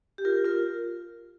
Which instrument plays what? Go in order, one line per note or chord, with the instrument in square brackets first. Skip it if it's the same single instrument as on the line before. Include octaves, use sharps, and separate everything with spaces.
[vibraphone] G4
F4 A#4
F4 A#4